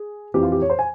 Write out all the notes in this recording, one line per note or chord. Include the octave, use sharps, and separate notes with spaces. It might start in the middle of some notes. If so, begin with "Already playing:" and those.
Already playing: G#4
F2 E3 G4
F4
G4
C#5
C5
G#5